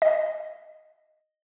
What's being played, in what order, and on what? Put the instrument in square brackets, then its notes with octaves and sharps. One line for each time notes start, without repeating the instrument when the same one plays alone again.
[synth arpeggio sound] D#5